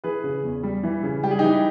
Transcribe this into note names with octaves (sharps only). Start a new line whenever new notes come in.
E3 G#4 B4
C#3
E2
G3
E3
C#3
G3 G4
G#4
E3 D#4 G4